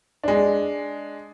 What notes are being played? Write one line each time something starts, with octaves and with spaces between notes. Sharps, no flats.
G#3 D4